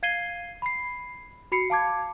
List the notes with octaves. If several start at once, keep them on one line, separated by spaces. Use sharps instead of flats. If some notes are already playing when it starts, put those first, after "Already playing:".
F5 G#6 C7 D#7 G7
B5 C7
F#4 B5 C7 C#7
F5 A5 D6 G#6